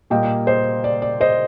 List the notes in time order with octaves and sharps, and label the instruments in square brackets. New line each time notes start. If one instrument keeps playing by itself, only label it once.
[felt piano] A#2 G3 A#3 D#5 G5
C5 D#5
D5
D5
C5 D#5